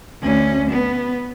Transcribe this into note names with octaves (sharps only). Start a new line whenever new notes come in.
D2 C#4
B3